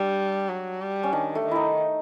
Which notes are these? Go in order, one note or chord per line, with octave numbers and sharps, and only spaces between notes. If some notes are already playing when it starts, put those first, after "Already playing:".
Already playing: G3 D4
F#3
G3
C#4
D#3 D4
A3
D#3
D#4 E4